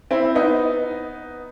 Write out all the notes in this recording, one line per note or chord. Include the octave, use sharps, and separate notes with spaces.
C4 E4
B3 D#4